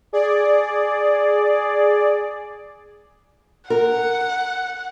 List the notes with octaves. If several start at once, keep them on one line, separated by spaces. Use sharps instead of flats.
G#4 D5
A#4 F#5